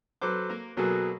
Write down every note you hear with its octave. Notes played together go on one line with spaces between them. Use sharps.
F#3 A4 B4 C5 D6
A#3 A#4
B2 F#3 A#3 F#4 G#4 A4